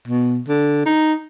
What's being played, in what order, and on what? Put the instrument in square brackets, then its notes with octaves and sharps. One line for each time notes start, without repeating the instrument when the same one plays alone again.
[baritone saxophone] B2
D3
D#4